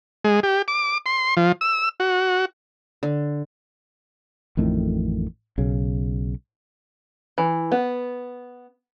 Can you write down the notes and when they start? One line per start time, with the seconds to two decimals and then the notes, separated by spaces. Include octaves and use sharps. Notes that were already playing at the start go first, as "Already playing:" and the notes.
0.24 G#3
0.43 G4
0.68 D6
1.06 C6
1.37 F3
1.61 E6
2.00 F#4
3.03 D3
4.57 A1 F2 A2 D#3
5.58 B1 C#3
7.38 E3
7.72 B3